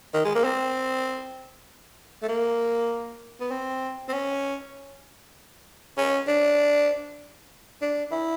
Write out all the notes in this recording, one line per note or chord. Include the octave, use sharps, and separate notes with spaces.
D#3
G#3
A#3
C4
A3
A#3
B3
C4
C4
C#4
C#4
D4
D4
E4